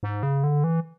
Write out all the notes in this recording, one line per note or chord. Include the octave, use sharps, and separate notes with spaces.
G#2
C#3
D3
E3